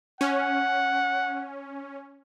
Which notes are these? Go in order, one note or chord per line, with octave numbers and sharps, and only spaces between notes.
C#4 F#5